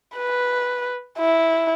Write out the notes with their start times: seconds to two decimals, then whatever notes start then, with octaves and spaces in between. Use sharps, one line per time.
0.17 B4
1.19 E4